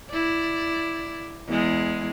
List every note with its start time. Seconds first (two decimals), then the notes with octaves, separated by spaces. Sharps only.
0.11 E4 D5
1.47 E2 G#3